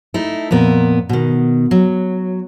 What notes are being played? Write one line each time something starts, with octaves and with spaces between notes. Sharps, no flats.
A3 D#4 E4
F2 A#2 B3 A#4
B2 D#3
F#3